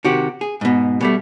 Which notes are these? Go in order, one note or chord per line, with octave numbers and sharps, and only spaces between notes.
C3 D#3 F#4 G4
G#4
G#2 B2
B2 G3 A3